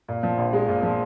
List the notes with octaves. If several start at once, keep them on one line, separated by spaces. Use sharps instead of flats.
A#2
F3
A#1
G#3
A#2
F3